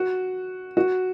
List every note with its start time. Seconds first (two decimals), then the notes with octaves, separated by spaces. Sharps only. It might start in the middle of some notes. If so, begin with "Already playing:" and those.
Already playing: F#4
0.77 F#4